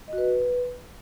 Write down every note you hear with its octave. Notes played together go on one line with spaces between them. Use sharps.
D#5
F#4
B4